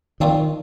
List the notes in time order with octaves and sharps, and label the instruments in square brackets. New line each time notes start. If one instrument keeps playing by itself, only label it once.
[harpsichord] A#2 F3 C4 [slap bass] D#3